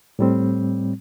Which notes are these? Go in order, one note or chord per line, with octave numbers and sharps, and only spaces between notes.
A2 G3 C4